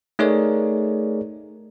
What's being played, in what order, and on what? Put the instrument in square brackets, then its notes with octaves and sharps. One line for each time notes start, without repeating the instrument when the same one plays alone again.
[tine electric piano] A3 D#4 G#4 A#4 C#5 D5